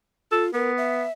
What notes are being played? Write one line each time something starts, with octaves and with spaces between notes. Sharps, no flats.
F4 A4
B3 A#4
E5